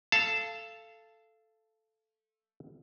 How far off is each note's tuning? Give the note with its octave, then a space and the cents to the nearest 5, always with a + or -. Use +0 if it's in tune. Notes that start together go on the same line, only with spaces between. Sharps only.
A4 +0 F5 -25 A5 +0